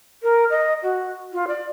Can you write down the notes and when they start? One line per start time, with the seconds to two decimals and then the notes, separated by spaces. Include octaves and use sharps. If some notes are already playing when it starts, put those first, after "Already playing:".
0.23 A#4
0.50 D#5
0.83 F#4
1.33 F4
1.48 D5